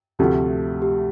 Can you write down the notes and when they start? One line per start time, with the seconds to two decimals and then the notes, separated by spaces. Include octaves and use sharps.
0.19 D2 C3 F3 A3 G4
0.82 G4